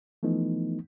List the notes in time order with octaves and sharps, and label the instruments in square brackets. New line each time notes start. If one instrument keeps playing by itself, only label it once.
[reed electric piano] E3 F3 A3 B3 D#4